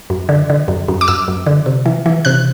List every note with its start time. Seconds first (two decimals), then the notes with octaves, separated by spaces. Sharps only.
0.10 F#2
0.29 D3
0.50 D3
0.68 F#2
0.88 F#2
1.01 D6
1.08 F#2 E6
1.28 F#2
1.46 D3
1.66 C3
1.86 E3
2.06 E3
2.25 C3 F#6